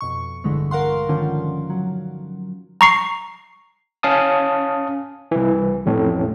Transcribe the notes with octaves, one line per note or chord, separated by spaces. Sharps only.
F2 B2 C#6
A#1 G2 D3 E3 G#3 A3
A#4 F5 F#5 C6
D3 D#3 F3 C#4
F#3
A#5 C#6 C7
C#4 F5 A5 D#6
C2 E3
A1 F2 A2